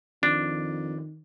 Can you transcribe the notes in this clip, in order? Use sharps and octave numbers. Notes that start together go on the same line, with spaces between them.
F2 D#3 D4